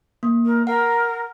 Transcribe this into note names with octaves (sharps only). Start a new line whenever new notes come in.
A#3
A#4
A#4 F#5